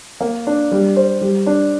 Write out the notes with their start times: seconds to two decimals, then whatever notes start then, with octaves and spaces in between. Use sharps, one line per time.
0.21 A#3
0.47 D4
0.72 G3
0.96 C5
1.21 G3
1.46 D4